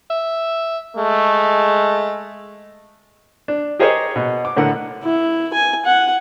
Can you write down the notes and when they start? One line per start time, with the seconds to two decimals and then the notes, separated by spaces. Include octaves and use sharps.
0.10 E5
0.97 G#3 A3
3.48 D4
3.79 G4 G#4 A#4 C5 C#5 D#5
4.16 B2
4.45 D6
4.57 A2 D3 A#4 F#5
5.04 E4
5.53 G#5
5.85 F#5